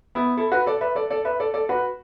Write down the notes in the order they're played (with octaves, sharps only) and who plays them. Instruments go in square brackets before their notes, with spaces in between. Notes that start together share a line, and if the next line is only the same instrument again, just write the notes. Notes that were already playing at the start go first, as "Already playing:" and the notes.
[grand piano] B3 E4
E4 A4
F#4 B4
A4 D5
B4 E5
A4 D5
A4 D5
B4 E5
A4 D5
A4 D5
F#4 B4